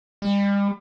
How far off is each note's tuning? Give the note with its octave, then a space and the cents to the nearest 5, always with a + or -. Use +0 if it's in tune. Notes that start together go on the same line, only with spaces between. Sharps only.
G3 +40